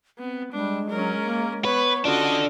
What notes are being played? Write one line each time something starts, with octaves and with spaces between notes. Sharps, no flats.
B3 C4
G3 G#3 D4
F#3 C#4 A#4
A#3
B3 B4 C#5 B5
C#4 D4 F4 F#4 A4 D#5